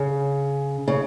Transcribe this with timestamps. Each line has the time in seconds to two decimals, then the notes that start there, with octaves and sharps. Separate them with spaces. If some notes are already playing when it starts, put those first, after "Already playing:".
Already playing: C#3
0.88 C#3